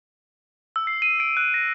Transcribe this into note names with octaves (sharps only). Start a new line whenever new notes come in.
E6
C7
D#7
D7
F#6
A#6